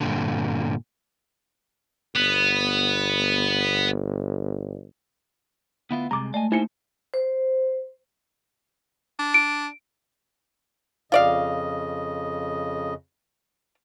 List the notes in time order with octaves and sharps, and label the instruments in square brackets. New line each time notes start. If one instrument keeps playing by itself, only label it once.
[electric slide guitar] G2 A#2 D3
[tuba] G1 [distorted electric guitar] B3
[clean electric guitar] D2 E4 F4 [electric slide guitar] B3
[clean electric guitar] C2 C3 [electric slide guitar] G#3 [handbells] A#5 D6 A6
[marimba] A3 [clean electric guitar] D5 D#5 G#5
[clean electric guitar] A#3 G4 [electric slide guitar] D#4 C5 G#5 [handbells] E4 C#7
[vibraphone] C5
[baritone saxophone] D4
[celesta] D7
[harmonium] F2 C#3 D#5 [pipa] F4 D5 F5